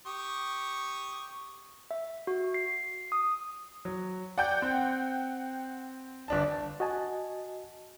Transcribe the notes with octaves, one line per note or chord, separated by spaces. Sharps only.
G4 C#6 D#6
E5
F#4
C7
D#6
F#3
D5 F#5 G5 G6
C4
G1 D4 A5
F#4 D#5 G#5 A5